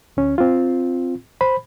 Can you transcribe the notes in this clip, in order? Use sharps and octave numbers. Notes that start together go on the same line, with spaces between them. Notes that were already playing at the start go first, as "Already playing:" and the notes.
D2 C#4
C4 F4
C5 B5